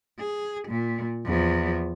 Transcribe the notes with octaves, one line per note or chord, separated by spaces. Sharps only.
G#4
A#2
E2 F3